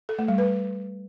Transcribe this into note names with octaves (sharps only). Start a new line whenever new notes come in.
A4
A3
G3
B4